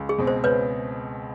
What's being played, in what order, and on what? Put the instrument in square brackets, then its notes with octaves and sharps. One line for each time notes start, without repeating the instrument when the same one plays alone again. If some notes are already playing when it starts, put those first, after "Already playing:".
Already playing: [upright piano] C#2
[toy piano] G#4
[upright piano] B2 G#3 C4
[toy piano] C5
[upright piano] C#2 [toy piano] B4 C#5